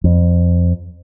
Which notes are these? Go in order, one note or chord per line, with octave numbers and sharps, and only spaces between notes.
F2